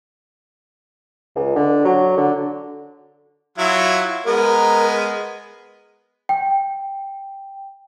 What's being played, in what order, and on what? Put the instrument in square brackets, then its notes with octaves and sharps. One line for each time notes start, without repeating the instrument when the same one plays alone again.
[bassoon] C#2
D3
F#3
D3
[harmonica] F#3 E4 F4
[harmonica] G#3 B3 [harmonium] A#4
[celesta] G5